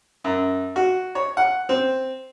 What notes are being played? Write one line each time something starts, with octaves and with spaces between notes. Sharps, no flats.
F#2
F#4
C#5
F#5
C4